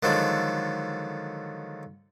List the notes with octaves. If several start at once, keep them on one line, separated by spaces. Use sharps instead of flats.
D3 D#3 F3 F#3 G#3 A4